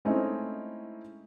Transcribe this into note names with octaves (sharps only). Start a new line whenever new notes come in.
G#3 A3 C4 C#4 D#4 E4